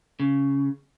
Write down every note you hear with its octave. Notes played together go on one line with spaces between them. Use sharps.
C#3